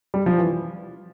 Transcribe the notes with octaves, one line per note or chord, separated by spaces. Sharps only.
G3
F3
E3